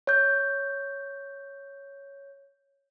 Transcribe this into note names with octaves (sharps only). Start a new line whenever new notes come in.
C#5 G6